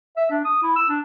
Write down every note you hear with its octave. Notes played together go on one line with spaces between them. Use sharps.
E5
D4
D#6
E4
E6
D4